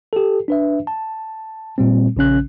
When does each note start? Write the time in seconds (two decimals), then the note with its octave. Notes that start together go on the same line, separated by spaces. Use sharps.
0.13 G4 A4
0.48 D4 B4 E5
0.87 A5
1.78 A#2 G3 C4
2.16 A#1 C#3 C#4 F#6